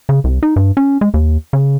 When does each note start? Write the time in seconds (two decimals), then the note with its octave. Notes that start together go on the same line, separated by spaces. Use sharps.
0.09 C#3
0.24 C2
0.43 D#4
0.56 G2
0.77 C#4
1.01 G#3
1.14 D#2
1.53 C#3